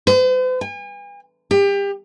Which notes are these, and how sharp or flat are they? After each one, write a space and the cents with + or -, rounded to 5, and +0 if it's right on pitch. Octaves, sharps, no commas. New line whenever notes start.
C5 -45
G#5 -40
G4 +30